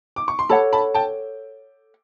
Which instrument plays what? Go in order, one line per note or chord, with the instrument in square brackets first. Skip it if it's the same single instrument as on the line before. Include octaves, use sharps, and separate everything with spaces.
[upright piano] D6
C#6
C6
[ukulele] A4 C#5 F#5 [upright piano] A5 B5
[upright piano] A5 B5
G5 A5